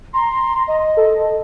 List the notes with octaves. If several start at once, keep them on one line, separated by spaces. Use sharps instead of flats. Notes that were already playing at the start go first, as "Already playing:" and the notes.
A#5 C6
D#5
A4